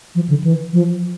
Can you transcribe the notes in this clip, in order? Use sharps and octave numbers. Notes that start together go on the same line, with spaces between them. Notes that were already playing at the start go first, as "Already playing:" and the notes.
F3
D3
E3
F3